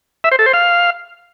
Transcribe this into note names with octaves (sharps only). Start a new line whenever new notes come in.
E5
C5
A4
C5
F5